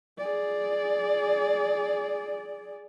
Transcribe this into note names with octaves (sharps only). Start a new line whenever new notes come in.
G#4 D5